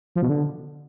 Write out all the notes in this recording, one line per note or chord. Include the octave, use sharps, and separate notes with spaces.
F3
B2
D3